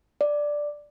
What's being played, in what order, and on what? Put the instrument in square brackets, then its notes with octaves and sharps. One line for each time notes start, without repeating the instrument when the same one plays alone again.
[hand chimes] D5